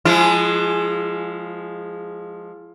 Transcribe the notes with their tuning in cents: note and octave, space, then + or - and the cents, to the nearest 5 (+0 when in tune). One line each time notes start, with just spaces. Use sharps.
F3 +10 G#3 +0 E4 +40